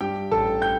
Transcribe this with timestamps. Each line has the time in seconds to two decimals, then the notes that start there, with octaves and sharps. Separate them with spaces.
0.01 G2 G4 G5
0.31 A1 A4 A5
0.62 G5 G6